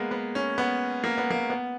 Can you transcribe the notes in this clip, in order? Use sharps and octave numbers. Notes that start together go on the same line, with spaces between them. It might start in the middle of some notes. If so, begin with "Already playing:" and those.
Already playing: G#3 A#3 B3
B3
C#4
B3
A#3
B3
A#3
B3